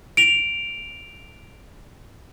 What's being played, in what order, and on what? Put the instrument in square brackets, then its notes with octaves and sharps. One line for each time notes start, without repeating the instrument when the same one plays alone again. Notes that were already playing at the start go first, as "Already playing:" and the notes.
[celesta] D7 F7